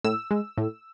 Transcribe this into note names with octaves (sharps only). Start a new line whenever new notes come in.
A2 E6
G#3
A2